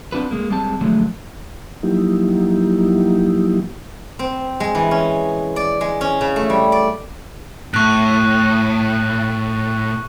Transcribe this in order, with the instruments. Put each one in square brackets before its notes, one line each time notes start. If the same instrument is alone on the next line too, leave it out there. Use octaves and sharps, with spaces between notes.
[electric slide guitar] C4 D4 F#4 B4
G#3 A#3
G3 G#3 C4 A5
D3 F3 F#3 G#3 A3
[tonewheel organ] F3 F#3 A#3 D#4 E4 G4
[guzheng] C4
G#3
E3
C#4
D5
G#3
C#4
C#3
A3
G3
D5
[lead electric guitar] A2 [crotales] C#6 F#6